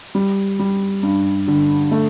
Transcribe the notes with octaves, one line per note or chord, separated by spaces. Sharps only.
G3
G3
G2
D3
A3